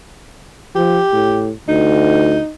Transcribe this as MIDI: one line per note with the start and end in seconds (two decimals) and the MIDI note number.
0.75 1.00 53
0.75 1.50 67
1.13 1.52 45
1.68 2.40 38
1.68 2.51 63